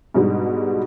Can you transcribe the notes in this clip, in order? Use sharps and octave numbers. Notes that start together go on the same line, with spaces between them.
G#2 B2 G3 D4 D#4